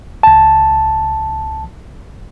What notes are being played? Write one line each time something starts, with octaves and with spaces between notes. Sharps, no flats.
C#2 A5